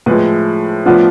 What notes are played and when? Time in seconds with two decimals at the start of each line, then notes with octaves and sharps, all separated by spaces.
0.06 A2 F3 G#3 B4
0.85 A2 F3 B3 D4 F4